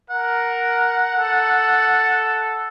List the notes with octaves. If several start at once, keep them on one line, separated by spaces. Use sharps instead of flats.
A#4 F#5
A4